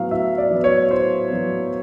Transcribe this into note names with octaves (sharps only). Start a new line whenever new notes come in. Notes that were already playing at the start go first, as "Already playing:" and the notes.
Already playing: A2 F#3 B3 F5
A2 E5
D5
F#3 B3
C#5
A2 C5
F#3 B3